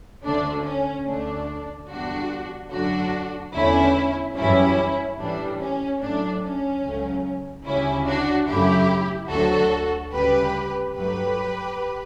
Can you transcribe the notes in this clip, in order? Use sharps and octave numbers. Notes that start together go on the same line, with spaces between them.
D2 D3 A3 D4
C#4
D2 D3 A3 D4
E2 D3 G3 D4 F#4
F#2 D3 F#3 A3 D4 F#4
E2 D3 A3 C#4 E4
F#2 E3 G3 C#4 E4
A2 E3 G3 D4
C#4
A2 F#3 A3 D4
C#4
C#2 C#3 F#3 A3
D2 C#3 G3 C#4 E4
D4 F#4
F#2 C#3 F#3 A3 E4 G4
D2 D3 F#3 A3 F#4 A4
D2 C#3 G3 G4 B4
G2 F#3 A3 G4 B4